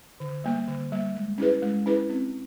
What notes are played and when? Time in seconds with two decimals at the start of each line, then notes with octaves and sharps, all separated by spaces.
0.20 D3
0.44 G3 A#3
0.68 D3
0.92 G3 A#3
1.15 G#3
1.38 C#4 E4 G#4 B4
1.62 G#3
1.86 C#4 E4 G#4 B4
2.09 C4